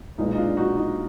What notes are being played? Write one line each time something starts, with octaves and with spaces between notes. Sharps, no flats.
B1 A#2 G#3 B3 D#4
D#4
D4 F4
D#4 F#4
D#4